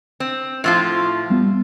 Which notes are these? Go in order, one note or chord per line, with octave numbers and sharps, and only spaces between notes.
C4
A2 F3 F4
G3 B3